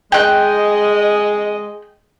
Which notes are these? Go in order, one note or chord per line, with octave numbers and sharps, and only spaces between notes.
G#3 D#5 G5 F#6